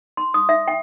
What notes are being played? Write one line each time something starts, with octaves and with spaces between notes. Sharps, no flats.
C6
D#6
E5
G5